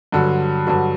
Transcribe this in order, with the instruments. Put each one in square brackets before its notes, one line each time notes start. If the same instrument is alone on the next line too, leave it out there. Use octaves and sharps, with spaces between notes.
[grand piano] G2 D3 F#3
G2 D3 F#3